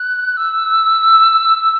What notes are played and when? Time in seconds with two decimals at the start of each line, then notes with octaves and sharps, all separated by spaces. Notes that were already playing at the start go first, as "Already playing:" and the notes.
Already playing: F#6
0.37 E6